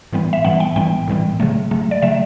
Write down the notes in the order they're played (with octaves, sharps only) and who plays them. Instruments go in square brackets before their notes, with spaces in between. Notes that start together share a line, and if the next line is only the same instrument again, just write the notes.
[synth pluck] A2 E3 G3 B3
E5
A2 E3 G3 B3 F#5
G5
A2 E3 G3 B3 G5
A2 E3 G3 B3
C#3 F#3 A3
C#3 F#3 A3
D5
C#3 F#3 A3 E5